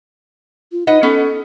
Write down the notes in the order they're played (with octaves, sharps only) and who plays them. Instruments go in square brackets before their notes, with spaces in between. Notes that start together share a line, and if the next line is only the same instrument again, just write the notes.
[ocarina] F4
[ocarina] D#4 [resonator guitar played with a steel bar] B4 D#5 F#5
[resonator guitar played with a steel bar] B3 C#4 [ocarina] A4